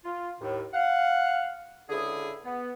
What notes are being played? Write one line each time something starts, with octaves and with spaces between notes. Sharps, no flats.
F4
D#2 A2
F5 F#5
C#2 D3 E4 G#4
B3